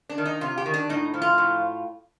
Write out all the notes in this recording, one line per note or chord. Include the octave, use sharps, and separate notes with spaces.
D4
D#3
D#4
C3 F4
G4
D#3
D4
A2 D#4
F3
F4
A2